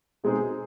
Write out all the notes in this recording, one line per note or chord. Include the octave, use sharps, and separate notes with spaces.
B2 G#3 C4 D#4 G#4